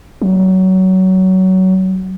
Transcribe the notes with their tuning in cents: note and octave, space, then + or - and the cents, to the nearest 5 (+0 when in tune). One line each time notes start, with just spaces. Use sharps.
F#3 +20